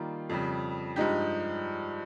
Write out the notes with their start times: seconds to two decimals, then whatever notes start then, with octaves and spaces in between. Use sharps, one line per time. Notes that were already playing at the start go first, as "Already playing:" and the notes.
Already playing: D#3 G3 A#3 F4
0.29 F2 C#3 G3
0.96 G2 F3 G#3 D#4 G4